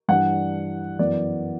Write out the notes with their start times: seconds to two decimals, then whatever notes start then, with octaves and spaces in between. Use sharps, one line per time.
0.08 G2 E3 G3 D4 F#5
0.99 F#2 E3 B3 D5